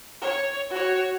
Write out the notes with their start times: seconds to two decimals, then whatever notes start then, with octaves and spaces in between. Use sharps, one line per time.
0.21 C#5
0.70 F#4 C#5